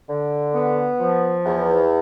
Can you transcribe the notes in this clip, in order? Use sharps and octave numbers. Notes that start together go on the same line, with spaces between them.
D3
B3
F3
E2